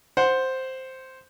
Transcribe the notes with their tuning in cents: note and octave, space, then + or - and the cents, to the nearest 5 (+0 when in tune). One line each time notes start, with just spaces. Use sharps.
C5 +0 F#5 -5